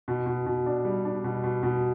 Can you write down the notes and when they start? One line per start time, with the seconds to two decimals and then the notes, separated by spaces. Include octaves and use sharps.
0.08 B2
0.26 B2
0.46 B2
0.66 D4
0.85 G3
1.05 D4
1.24 B2
1.44 B2
1.63 B2